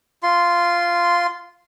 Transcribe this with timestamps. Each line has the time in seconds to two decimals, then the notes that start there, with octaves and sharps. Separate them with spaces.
0.23 F4 C6